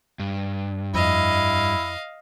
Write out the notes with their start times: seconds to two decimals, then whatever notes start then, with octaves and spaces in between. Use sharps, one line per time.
0.19 G2
0.95 F2 E4 D#5 F5